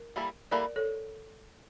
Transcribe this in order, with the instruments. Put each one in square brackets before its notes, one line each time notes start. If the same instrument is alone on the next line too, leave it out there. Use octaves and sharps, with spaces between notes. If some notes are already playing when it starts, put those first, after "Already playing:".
Already playing: [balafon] A#4
[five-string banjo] E3 G3 A#3 E4 A4
[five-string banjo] E3 G3 A#3 E4 A4 [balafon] A#4 D5
[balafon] A4 C#5